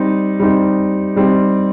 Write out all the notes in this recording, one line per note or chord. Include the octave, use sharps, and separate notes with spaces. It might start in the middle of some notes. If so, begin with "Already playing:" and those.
Already playing: G3 C4 D#4
G3 C4 D#4
G3 C4 D#4